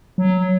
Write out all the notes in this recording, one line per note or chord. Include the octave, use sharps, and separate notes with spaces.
F#3